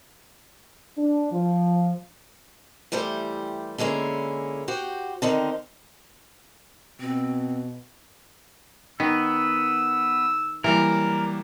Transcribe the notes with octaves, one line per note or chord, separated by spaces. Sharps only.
D4
F3
E3 G3 A3 G4 C5
D3 G#3 A#3 C#4 E4
F#4 G4 C5
D3 D#3 C4 D#4
B2 C4
D#3 B3 E6
E3 F#3 G3 A#3 A#4